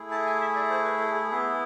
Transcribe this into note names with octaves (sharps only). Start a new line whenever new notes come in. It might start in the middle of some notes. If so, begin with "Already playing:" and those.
Already playing: A3 E4 G#4
A5
G#5
E5
D5
C5
B4
A4
G#4
B3 E4 G#4